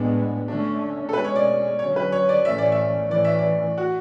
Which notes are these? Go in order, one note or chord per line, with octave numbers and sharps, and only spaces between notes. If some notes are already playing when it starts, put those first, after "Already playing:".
Already playing: A2 G#3 B3 D4
D3 A3 C#4 D4
A4
B2 G#3 C#4 B4
C#5
D5
D3 F#3 C#4 C#5
B4
C#5
D5
A2 E3 A3 C#4 E5
D5
E5
A2 E3 A3 C#4 D5
E5
D5
F#4